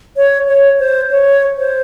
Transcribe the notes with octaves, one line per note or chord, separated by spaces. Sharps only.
C#5
C#5
C5
C#5
C5